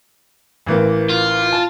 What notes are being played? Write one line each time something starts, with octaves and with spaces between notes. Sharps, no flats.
A1 E3 A#3
F4
A5